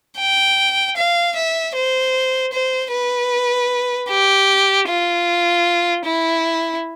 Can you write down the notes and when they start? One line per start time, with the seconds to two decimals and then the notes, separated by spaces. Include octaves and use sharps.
0.19 G5
0.97 F5
1.36 E5
1.75 C5
2.53 C5
2.92 B4
4.10 G4
4.88 F4
6.05 E4